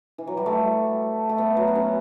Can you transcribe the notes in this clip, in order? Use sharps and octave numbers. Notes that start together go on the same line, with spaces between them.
E3
F#3
G3
A3
A3
B3
F#3
B3
C#4